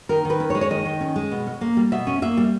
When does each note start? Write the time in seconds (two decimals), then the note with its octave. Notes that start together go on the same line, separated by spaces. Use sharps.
0.09 D#3 A#4
0.25 D#3 B4
0.40 C#4
0.50 C#5
0.55 G#3
0.61 C#5
0.70 D#3 D#5
0.85 D#3
1.01 C#4
1.16 G#3
1.31 B2
1.47 C#4
1.61 A#3
1.77 G3
1.92 B2 E5
2.07 C#4
2.22 A#3 E5
2.37 G3